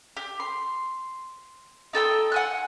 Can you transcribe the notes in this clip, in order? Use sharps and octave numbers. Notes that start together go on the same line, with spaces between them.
G4
C6
D#4 A4 G5 E6
F#5 G#5 F#6